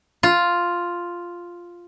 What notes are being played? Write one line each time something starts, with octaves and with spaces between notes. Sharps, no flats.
F4